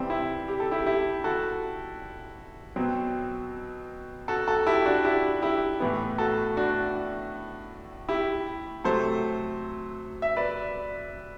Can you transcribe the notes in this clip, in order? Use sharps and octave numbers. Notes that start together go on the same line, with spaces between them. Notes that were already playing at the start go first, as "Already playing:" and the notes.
Already playing: C3 E3 G3 C4
E4
G4
A4
E4 G4
E4 G4
F#4 A4
B2 F#3 C4
F#4 A4
F#4 A4
E4 G4
D4 F#4
E4 G4
E4 G4
A2 E3 B3
F#4 A4
D4 F#4
E4 G4
C3 F#3 A3 A4 C5
E5
B4 D5